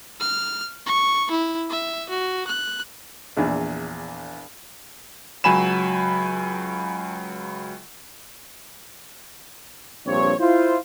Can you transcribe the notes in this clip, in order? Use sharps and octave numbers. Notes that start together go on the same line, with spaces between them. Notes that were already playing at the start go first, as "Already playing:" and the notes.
F6
C#6
E4
E5
F#4
F#6
A#1 E2 A#2
C#2 F#3 G#5 B5 E7
A#1 G2 C4 C#5
E4 F4 C5